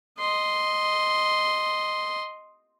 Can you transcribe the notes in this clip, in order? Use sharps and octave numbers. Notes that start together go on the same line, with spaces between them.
D#5 C6